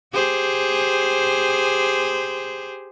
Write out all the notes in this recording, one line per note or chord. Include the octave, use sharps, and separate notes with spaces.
G4 G#4 C5